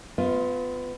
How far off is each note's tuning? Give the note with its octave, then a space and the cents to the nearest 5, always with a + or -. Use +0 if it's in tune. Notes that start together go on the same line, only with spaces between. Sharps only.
B3 +25 F4 +0 E5 -45